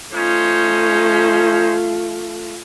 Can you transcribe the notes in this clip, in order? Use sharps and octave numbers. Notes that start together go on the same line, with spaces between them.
A3 C#4 D#4 F4 C5